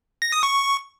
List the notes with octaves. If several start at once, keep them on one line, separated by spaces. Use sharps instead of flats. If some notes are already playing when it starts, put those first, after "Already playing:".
A#6
D#6
C#6